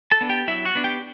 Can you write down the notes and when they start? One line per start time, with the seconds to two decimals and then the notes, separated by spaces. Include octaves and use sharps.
0.11 A4 A5
0.21 B3 D4
0.29 G4 G5
0.48 F#3 E4 E5
0.65 F#4 F#5
0.75 B3 D4
0.84 G4 G5